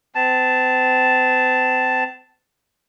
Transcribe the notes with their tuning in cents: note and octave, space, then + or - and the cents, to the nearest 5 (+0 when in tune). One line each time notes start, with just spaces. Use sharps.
C4 -40 A5 +0